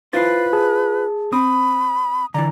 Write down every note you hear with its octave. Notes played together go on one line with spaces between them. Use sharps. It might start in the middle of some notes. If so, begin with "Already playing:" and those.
E4 F4 B4 C5 A6 C7
G#4 A5
C4 B5 D#6
D3 E3 D5 A#5